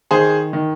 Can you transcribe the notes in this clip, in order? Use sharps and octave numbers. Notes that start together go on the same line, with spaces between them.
D#3 G#4 C5
D#3